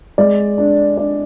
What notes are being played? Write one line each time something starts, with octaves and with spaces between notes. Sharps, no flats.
G#3 D5
D4
D4 D5